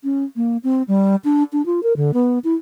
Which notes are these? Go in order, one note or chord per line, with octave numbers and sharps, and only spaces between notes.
C#4
A#3
C4
G3
D4
D4
F4
A#4
D3
B3
E4